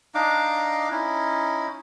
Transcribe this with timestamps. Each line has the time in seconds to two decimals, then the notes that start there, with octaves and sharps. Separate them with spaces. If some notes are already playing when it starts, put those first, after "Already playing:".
0.15 D4 D#4 F5 D6
0.91 C#4 D#4 E4